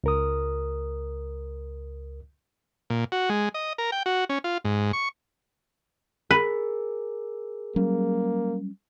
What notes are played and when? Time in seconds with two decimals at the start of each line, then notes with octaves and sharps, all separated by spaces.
0.04 C#2 A#4 D#6
2.90 A#2
3.12 F#4
3.29 G#3
3.54 D#5
3.78 A#4
3.92 G5
4.06 F#4
4.29 C#4
4.44 F4
4.65 G#2
4.93 C#6
6.31 G#4 A#4 B4
7.76 F#3 G3 A#3 C#4